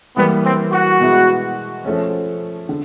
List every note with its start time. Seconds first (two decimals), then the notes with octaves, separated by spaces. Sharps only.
0.17 E3 G3 A#3 B3
0.44 C4
0.72 F#4
1.00 B2 G#3 B3 E4
1.85 F3 A3 C#4
2.69 D3